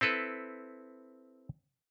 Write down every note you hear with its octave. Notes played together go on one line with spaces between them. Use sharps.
C4 E4 A4 B4